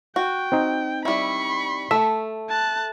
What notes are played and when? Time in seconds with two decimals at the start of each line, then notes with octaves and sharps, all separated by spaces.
0.16 F#4 G5
0.52 C4 D#4
1.05 G3 E4 B5 C#6
1.91 A3 A4 E5
2.49 A5 F#6